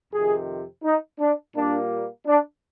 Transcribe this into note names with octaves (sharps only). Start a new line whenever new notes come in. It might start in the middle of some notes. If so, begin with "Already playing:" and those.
F2 C3 D#3 G#4
D#4
D4
A#2 G3 A#3 D4
D4